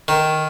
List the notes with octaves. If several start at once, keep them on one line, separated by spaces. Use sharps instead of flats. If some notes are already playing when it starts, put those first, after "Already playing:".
D#3